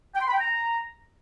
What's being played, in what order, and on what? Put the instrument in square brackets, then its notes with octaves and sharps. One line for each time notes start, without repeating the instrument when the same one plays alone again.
[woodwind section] G5
C6
B5
G5
A#5